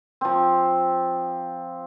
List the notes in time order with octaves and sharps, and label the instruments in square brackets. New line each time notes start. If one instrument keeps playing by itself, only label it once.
[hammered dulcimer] F3 C4